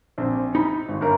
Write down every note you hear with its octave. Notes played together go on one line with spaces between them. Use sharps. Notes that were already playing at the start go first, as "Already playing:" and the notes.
A#1 C4
D#4 B5
G#1
G1 A#4